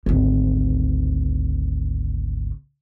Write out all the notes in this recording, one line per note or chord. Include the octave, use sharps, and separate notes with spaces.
G#1 D2